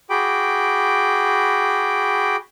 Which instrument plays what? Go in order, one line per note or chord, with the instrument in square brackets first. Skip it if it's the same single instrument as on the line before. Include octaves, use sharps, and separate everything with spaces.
[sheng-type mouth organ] F#4 G#4 G5 B5 D6